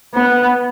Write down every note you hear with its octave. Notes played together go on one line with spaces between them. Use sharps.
B3